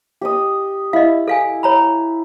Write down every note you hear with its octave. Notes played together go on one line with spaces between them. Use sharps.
G4 D#5 D#6
E4 D#5 F5
A4 F5 G#5
C#5 A#5 B5